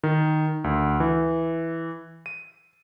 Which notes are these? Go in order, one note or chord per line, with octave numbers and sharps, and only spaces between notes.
D#3
D2
E3
D#7